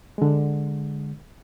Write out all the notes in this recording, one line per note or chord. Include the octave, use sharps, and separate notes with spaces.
D3 G#3